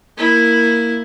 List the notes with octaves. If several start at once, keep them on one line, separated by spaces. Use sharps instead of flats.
A#3 E4